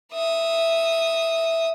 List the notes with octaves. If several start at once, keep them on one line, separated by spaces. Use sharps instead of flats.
E5 D#6